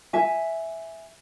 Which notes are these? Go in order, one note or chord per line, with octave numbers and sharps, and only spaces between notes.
E5 G#5